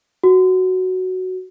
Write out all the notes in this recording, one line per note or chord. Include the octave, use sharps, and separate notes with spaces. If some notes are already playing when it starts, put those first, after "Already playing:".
F#4